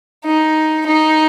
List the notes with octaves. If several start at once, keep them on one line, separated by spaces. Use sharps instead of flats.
D#4
D#4